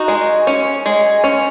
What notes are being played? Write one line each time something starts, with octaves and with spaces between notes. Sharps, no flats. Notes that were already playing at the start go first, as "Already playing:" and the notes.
Already playing: D#4 F#4
G#3
C#4
G#3
C#4